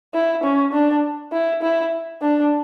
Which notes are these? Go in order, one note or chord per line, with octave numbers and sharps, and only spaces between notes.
E4
C#4
D4
E4
E4
D4